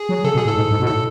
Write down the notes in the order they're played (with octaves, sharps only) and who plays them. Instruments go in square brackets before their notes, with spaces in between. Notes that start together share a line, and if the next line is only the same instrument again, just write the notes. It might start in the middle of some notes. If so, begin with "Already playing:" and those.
Already playing: [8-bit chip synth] G#4
[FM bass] F#3
[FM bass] C#3 [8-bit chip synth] A4
[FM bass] B2 [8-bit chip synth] G#4
[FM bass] A2
[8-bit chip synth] A4
[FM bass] G#2
G#2
B2
[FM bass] A2 [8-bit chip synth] A4